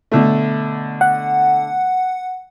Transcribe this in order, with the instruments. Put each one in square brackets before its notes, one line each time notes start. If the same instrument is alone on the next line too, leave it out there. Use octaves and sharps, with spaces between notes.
[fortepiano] B2 D3 A3
[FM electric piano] F#5